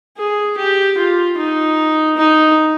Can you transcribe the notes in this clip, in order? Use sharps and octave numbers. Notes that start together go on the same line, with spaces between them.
G#4
G4
F4
D#4
D#4